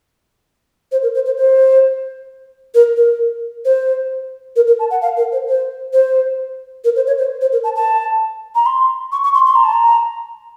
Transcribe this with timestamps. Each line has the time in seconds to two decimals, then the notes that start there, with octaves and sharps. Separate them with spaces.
0.92 C5
1.03 A#4
1.14 C5
1.26 C5
1.37 C5
2.74 A#4
2.97 A#4
3.65 C5
4.56 A#4
4.67 A#4
4.79 A5
4.91 F#5
5.02 F5
5.17 A#4
5.32 C5
5.47 C5
5.93 C5
6.84 A#4
6.96 C5
7.07 C#5
7.18 C5
7.41 C5
7.53 A#4
7.64 A5
7.76 A5
8.55 A#5
8.66 C6
9.12 C#6
9.24 C#6
9.35 C6
9.46 C6
9.55 A#5
9.64 A5
9.73 A#5